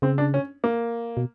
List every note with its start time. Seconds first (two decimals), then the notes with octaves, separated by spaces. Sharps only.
0.02 C#3 C4
0.18 D4
0.34 C#4
0.64 A#3
1.17 B2